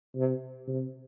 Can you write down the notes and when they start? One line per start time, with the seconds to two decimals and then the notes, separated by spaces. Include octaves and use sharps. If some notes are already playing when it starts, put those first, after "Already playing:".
0.16 C3
0.68 C3